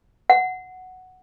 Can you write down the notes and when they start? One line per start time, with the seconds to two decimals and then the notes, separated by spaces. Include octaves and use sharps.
0.30 F#5